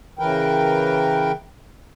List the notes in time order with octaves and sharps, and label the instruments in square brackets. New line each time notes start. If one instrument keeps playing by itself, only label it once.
[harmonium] C#3 E3 A#4 B4 G5